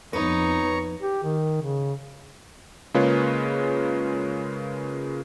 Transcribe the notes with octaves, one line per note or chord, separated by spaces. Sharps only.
F2 B3 D#4 B4 C#5 A#5 C#6
G4
D#3
C#3
C#3 G#3 A#3 F4 B4 C#5